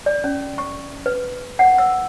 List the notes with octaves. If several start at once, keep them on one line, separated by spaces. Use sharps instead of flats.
D5
C#4
C#6
B4
F#5
E6